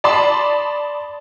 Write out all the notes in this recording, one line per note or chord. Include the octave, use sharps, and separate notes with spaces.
D5 A5 B5 C6 D#6